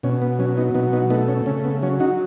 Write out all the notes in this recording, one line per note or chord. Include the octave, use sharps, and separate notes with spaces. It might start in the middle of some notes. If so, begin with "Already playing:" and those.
B2 C#4
B3
F#3 C#4
B3 D#4
B2 B3 D#4
B3 D#4
A3 B3 D#4
C#4
C#3 C#4
B3
F#3 C#4
D#4 F#4